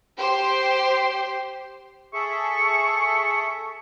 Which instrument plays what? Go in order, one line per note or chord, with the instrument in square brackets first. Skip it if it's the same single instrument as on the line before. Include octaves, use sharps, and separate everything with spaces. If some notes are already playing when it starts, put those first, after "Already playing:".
[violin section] G4 C5 C6
[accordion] G#4 A4 E5 [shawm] C#6